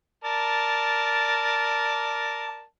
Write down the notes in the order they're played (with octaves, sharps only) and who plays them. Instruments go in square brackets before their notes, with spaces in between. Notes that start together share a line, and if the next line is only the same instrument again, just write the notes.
[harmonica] A#4 D5 A5